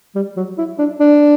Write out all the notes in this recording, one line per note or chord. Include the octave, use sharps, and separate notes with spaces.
G3
F#3
E4
D4
D4